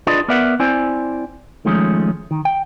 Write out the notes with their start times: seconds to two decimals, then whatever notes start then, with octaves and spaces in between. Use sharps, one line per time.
0.07 D4 F4 G#4 B4 D5 D#5
0.28 B3 A#4 B4 D5 E5 F#5
0.60 C4 E4 C5 D5 G#5
1.65 D#3 F3 G#3 A3 C#4
2.31 D#3
2.45 G5